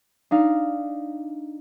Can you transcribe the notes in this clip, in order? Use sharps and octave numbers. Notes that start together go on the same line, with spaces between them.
D4 D#4 F5